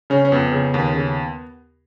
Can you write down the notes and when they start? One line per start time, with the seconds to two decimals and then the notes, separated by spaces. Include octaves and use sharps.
0.10 C#3 C#4
0.25 C#4
0.32 F2 B3
0.52 C#3
0.74 D#2
0.94 C#3